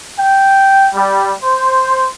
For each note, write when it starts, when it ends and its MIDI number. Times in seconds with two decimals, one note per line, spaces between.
0.18 0.89 79
0.95 1.33 55
1.43 2.09 72